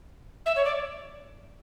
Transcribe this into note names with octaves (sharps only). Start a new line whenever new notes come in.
E5
C#5
D5